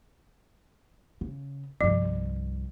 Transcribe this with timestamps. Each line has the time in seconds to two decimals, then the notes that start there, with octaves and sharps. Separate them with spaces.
1.21 C#3
1.81 C2 G2 F3